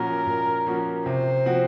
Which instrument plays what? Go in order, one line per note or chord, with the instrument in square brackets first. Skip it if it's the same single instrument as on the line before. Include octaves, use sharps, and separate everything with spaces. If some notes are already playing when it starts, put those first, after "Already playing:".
Already playing: [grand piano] A#2 F3 A#3 C#4 F#4 [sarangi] A#4
[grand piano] A#2
F3 A#3 C#4 F#4
[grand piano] C3 [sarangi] C5
[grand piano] F3 C4 F#4